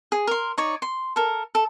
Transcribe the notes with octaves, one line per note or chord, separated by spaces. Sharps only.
G#4
A#4 C6
D#4 C#5 D5
C6
A4 A#4
A4